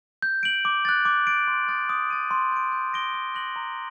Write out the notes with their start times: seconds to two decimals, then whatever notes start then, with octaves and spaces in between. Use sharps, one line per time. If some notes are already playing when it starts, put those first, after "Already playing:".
0.22 G6
0.43 D7 F#7
0.65 D6
0.85 F#6 A6
1.05 D6
1.27 A6 D7
1.48 C6
1.68 D#6 F#6 A6
1.89 D#6
2.10 A6 D#7
2.31 C6
2.52 G6 D7
2.72 G6
2.93 A#6 D7 G7
3.14 D#6
3.35 F#6 A#6 F#7
3.56 A#5